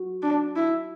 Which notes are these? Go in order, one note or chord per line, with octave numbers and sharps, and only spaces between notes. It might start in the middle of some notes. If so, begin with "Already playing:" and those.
Already playing: F#4
D4
E4